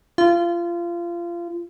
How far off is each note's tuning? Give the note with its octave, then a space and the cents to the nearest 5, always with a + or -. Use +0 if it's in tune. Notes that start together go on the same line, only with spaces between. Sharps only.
F4 -25